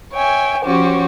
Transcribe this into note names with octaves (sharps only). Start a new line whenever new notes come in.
C#5 E5 G5 G#5
F3 C#4 F#4 G4 C5 C#5